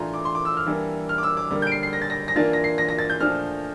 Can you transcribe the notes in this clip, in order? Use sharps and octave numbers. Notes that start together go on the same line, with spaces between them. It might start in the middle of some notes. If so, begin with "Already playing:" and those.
Already playing: A2 E3 A3 D4 F4 A#5 C6
D6
C6
D6
E6
F6
E3 G3 A#3 D4
F6
D6
E6
D6
D3 G3 A#3
G6 D7
C7
C7
A#6
A6
A#6
A#6
E3 A#3 D4 F4 A6
A#6
C7
A#6
A#6
A6
G6
A#2 F3 A3 D4 F6